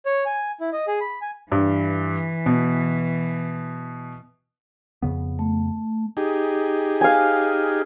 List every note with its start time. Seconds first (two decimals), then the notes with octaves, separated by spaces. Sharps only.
0.06 C#5
0.26 G#5
0.61 E4
0.73 D#5
0.88 G#4
1.01 B5
1.21 G#5
1.52 G2 E3
2.46 B2
5.02 F2 C#3 B3
5.39 A3
6.17 D#4 G4 G#4
7.01 F5 G#5